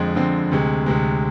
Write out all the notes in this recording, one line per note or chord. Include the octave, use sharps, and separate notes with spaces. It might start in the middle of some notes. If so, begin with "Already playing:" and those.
Already playing: F2 D3 G#3 C4
F2 D3 G#3 C4
D2 C3 G#3
D2 C3 G#3